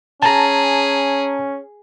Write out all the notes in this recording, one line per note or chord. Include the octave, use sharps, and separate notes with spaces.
C#4 G#4 A5 A#5